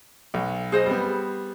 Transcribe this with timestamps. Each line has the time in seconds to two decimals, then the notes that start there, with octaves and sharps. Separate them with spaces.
0.34 B1
0.72 G#4 C5 D#5
0.86 G3 B3